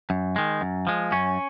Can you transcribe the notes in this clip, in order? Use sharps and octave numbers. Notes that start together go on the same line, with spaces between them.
F#2
D#3 G#3
F#2
F3 G#3
F#2 C#4